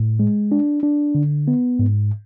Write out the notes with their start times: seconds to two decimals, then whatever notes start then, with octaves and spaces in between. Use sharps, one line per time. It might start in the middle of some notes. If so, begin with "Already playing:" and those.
Already playing: A2
0.20 G#3
0.52 D4
0.83 D4
1.15 D3
1.48 B3
1.79 G#2